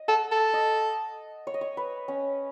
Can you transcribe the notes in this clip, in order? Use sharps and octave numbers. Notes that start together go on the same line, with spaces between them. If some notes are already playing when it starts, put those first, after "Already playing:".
Already playing: D#5
A4 F#5
A4
D#5
C#5
D#5
C#5
B4
C#4